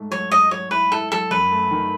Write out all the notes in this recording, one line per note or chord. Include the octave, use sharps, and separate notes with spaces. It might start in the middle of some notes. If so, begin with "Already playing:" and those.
Already playing: G#2 A3
F#3 C#5
G#2 D#5
F#3 C#5
E4 B4
E4 A4
F#3 A4
F#2 B4
A3
D#3